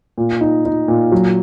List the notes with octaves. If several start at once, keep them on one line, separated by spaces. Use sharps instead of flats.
A#2
D#4
D#4
A#2
F#3